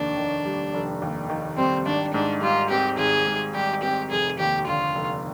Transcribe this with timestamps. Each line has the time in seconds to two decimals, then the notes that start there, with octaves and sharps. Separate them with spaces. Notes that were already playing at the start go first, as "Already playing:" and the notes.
Already playing: F1 D#2 D4
0.17 D#3
0.46 G3
0.74 F1
1.02 D#2
1.30 D#3
1.58 G3 C4
1.86 G#1 D4
2.13 G#2 D4
2.41 G3 F4
2.70 C4 G4
2.98 G#1 G#4
3.27 G#2
3.54 G3 G4
3.83 C4 G4
4.11 F1 G#4
4.39 D#2 G4
4.67 D3 F4
4.95 F1